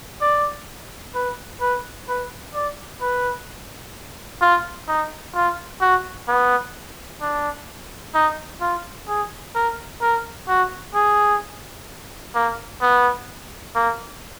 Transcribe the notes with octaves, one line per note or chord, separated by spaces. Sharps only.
D5
B4
B4
B4
D5
B4
F4
D#4
F4
F#4
B3
D4
D#4
F4
G#4
A#4
A#4
F#4
G#4
A#3
B3
A#3